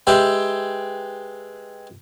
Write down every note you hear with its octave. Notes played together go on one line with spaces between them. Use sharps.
G#3 G4 B4 E5 G5